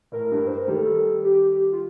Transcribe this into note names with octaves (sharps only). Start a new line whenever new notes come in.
A2 A#4
G2
C5
A#4
D#3 G3 A4
G4
F4